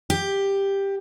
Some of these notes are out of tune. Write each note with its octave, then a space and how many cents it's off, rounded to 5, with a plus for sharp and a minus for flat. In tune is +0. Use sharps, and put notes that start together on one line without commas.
G4 +10